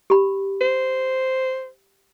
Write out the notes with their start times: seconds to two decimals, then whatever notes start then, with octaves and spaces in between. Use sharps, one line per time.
0.10 G4 B5
0.61 C5